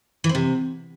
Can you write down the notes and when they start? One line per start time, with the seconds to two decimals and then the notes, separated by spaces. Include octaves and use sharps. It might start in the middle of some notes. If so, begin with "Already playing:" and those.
0.24 E3
0.29 C4
0.35 C3